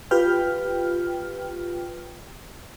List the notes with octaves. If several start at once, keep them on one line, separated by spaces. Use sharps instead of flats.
F4 G4 B4 G5 F6